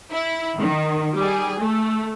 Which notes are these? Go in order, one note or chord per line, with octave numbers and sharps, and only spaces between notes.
E4
D#3
G3 G#4
A3